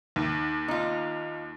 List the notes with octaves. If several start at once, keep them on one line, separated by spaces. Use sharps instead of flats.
D#2
D#4 F4